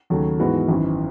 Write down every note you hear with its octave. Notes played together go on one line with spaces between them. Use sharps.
D#2 C#3 F#3 A3
G#2 E3 G#3 B3 F#4
G#1 F#2 E3